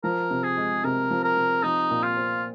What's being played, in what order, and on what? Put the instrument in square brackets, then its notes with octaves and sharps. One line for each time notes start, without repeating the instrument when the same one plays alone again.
[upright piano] F3 [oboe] A#4
[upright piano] C3
[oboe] G#4
[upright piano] G#3
[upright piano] C3 [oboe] A#4
[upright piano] F3
[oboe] A#4
[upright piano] C3
[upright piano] F3 [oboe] D#4
[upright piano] A#2
[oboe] F4
[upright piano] C4